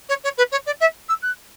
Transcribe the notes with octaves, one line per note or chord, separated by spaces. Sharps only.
C#5
C#5
B4
C#5
D5
E5
E6
F#6